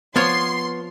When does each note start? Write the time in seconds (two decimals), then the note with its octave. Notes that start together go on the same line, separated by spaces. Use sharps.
0.16 F3 B3 F4 C#5 C6